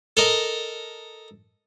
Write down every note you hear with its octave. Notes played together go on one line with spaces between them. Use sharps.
A4 A#4 D#5